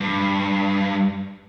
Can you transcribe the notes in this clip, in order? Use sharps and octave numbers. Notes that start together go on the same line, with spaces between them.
G2